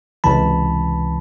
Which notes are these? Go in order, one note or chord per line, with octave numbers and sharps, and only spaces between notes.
C#2 C3 E3 A5 B5